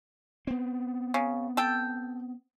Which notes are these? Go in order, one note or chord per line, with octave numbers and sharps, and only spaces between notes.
B3 C4
C#3
A4 G5